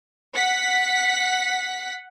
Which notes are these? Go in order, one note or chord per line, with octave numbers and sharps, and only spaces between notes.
F#5 B6